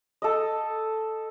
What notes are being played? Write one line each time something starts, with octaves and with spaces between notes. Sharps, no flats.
A4 D#5